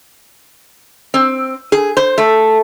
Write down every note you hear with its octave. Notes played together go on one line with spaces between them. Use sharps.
C4
G#4
C5
A3